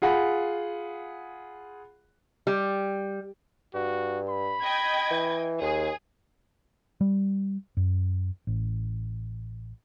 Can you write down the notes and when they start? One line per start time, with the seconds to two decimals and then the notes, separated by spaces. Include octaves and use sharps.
0.02 F4 G#4 F#5 B5
2.47 G3
3.74 G2 F#4
4.29 B5
4.62 D#5 G5 G#6
5.11 E3
5.61 D#2 G#4
7.01 G3
7.77 F#2
8.47 A1